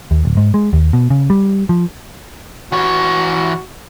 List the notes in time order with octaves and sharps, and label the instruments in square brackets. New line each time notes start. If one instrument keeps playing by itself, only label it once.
[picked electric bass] D#2
D1
G#2
G#3
D#2
B2
C#3
G3
F3
[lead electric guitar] E3 C#5 [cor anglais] F#4